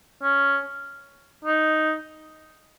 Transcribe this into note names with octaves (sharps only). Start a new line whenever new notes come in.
C#4
D#4